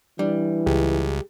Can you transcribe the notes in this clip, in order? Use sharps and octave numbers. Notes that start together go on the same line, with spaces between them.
E3 G3 D4
C#2 G4 G#4